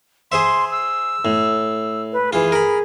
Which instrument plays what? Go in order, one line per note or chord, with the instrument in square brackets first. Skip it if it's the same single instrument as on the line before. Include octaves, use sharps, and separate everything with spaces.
[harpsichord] G#4 C5 E5 [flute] C6
[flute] E6
[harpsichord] A2
[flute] B4
[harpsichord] E3 F4 [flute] G#4
[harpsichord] A#4 B5